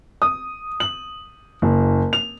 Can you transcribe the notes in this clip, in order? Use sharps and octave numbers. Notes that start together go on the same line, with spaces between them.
D#6
F#7
F#1
F7